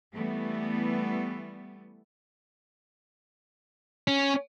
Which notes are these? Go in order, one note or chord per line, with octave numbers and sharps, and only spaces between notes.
E3 G3 A3 B3
C#4